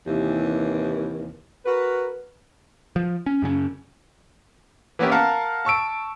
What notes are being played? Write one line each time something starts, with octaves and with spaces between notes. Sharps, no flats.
D#2 C3 E3
F#4 A#4 B4
F3
C#4
F#2 C#3 C#4
E3 A#3 B3 C#4 E4 G4
A#4 F5 F#5 A5
A5 C#6 E6 D7